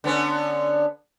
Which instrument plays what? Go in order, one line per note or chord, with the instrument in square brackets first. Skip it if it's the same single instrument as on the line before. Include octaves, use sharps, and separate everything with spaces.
[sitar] D3 B3 C#4